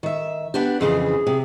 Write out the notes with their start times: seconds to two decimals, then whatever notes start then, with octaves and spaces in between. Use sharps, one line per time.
0.03 D#3 E5
0.54 B3 D4 G4
0.81 F2 C#3 E3 G#4
1.27 C3